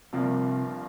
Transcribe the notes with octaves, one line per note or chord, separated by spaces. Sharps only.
G1 G2 C3 F3 A#3 D4